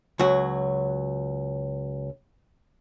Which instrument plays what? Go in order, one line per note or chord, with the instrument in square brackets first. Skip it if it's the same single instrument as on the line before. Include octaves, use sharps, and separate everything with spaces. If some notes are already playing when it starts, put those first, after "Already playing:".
[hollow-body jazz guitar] C#2 F#3 F#4